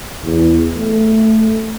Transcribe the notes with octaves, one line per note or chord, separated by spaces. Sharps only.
E2
A3